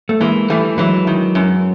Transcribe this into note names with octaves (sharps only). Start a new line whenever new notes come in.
A3
E3 G#3 A#3
E3 G3 A3
E3 F#3 G#3
D#3
F#2